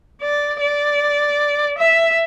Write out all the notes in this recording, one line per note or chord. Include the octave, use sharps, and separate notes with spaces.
D5
D5
E5